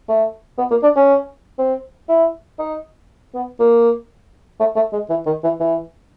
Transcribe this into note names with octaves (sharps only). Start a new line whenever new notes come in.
A3
B3
A#3
D4
C#4
C4
E4
D#4
B3
A#3
A3
A3
G#3
E3
D#3
E3
E3